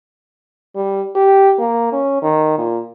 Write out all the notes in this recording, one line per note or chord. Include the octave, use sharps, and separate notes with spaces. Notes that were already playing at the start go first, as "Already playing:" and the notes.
G3
G4
A#3
C#4
D#3
A#2